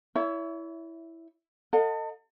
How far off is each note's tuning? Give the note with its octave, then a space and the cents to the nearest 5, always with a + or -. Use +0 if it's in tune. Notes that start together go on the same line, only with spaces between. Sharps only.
E4 +0 C#5 +35 E5 +10
A4 +35 D#5 +0 F#5 -45